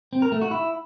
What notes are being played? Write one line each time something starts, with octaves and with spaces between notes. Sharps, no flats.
C4
A#4
A3
F#4
E4